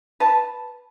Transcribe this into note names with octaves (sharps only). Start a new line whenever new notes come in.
B4 A5